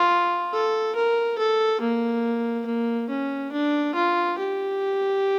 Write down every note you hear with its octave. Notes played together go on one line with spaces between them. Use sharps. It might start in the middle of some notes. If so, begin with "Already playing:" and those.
Already playing: F4
A4
A#4
A4
A#3
A#3
C#4
D4
F4
G4